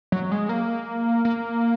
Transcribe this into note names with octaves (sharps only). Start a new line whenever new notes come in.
F#3
G#3
A#3
A#3